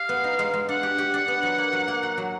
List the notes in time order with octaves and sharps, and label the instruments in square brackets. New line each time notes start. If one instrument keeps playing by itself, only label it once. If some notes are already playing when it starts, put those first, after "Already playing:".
Already playing: [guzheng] G4 [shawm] F5
[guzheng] B3
D#4
G#3
G#3
[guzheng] D4 [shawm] F#5
[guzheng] G4
G4
D4
B3
F#3
A#3
F#3
A#3
F#3
F#3